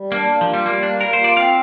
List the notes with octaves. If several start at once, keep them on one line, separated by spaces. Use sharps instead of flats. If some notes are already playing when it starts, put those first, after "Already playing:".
Already playing: G3
A#3 D4
A#3
F3
F4
G3
G3 A#3
A#3 D4
A#3 A#4
C5
F4
D5
C4 F5